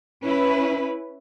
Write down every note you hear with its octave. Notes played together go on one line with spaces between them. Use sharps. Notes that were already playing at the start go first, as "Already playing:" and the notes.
C#4 E4 B4